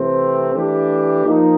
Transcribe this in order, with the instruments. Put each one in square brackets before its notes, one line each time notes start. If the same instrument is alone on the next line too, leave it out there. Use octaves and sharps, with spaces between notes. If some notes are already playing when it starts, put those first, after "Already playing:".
Already playing: [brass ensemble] C3 E3 A3 C4
E3 A3 D4 G4
F3 A#3 D#4